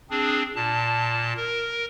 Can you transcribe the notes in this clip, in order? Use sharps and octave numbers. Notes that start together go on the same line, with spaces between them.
C4 D4 G#4
A#2 A5
A#4